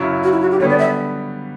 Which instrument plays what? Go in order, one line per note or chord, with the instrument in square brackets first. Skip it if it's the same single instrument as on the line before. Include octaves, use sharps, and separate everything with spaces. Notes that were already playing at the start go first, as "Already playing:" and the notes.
Already playing: [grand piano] F#2 C#3 F#3 C#4 E4
[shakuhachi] F#4
E4
F#4
G4
[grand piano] D3 G3 B3 [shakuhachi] C#5
[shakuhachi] D5
E5